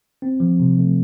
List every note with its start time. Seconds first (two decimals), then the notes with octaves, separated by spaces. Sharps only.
0.22 C4
0.40 F3
0.60 C3
0.78 A3